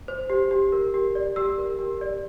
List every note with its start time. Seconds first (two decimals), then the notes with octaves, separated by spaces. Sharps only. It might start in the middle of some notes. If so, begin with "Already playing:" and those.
0.08 C5
0.30 G4
0.51 G4
0.72 A#4
0.94 G4
1.15 D5
1.36 G4 E6
1.58 A#4
1.79 G4
2.01 D5